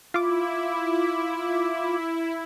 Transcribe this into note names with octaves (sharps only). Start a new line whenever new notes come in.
E4 F4 D6